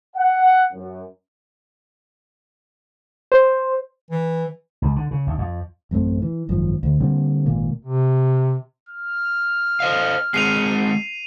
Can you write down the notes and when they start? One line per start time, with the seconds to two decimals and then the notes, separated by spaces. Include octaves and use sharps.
0.16 F#5
0.73 F#2
3.32 C5
4.11 E3
4.82 C#2
4.96 D3
5.11 C#3
5.27 D2
5.38 F2
5.91 A1 F#2 A3 C4
6.22 E3
6.49 G#1 F#2 F3
6.83 D2
7.01 D3 G3 A#3 C4
7.46 G#1 A#2 A#3
7.83 C3
8.89 F6
9.80 C5 D#5 F5
10.34 G#3 C4 G#4 C7 D#7 F7